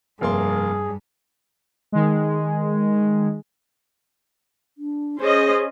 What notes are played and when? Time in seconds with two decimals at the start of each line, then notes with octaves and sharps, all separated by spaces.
0.21 F1 G2 A#3 G#4 C6
1.92 D#3 G#3
4.78 D4
5.20 C#4 G#4 C5 D#5